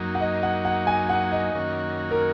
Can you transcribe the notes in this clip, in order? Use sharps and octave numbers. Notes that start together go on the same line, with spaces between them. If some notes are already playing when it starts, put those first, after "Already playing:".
Already playing: F#2 F#3 A#3 D#4
F#5
D#5
F#5
F#5
G#5
F#5
D#5
F#2 D#3 A#3 C#4 F#4
A#4